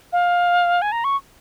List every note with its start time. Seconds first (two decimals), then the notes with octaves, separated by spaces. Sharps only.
0.13 F5
0.82 G#5
0.92 A#5
1.04 C#6